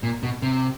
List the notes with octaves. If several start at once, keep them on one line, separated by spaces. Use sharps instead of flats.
A#2
B2
C3